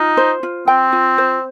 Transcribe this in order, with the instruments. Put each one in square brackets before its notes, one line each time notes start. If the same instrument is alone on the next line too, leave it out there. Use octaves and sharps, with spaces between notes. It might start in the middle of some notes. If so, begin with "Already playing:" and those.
Already playing: [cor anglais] D#4 [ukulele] F4
[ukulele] C5
F4
[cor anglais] C4 [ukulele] G5
[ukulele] F4
C5